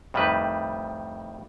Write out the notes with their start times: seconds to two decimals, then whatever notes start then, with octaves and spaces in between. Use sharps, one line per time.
0.14 F2 A2 D#3 G3 B4